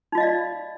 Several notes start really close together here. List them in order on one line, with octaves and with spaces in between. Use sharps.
D#4 F4 D#5 F5 D5